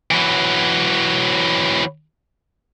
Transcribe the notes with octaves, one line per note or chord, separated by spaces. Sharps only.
E3 F#3